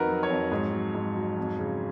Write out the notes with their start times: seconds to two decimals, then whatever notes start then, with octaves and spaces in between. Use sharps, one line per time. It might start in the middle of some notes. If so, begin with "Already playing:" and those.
Already playing: F2 D#3 F#4 A#4 B4
0.08 F#3
0.23 C#5
0.29 F2
0.51 G#2
0.73 F#3
0.95 G#2
1.16 F#3
1.38 F2
1.59 C#3